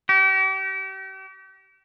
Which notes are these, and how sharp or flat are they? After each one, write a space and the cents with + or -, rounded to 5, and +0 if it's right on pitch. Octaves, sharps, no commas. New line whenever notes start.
G4 -40